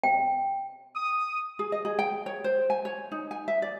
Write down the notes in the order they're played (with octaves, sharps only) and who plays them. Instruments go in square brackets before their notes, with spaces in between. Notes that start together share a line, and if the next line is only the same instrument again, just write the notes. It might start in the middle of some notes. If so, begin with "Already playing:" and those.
[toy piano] G5
[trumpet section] D#6
[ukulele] G#4
D#5
G#4
G5
C#5
C5
G#5
C#5
D#4
G#5
E5
D5